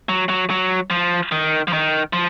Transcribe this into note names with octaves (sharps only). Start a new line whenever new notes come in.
F#3
F#3
F#3
F3
D#3
F3
D#3
F3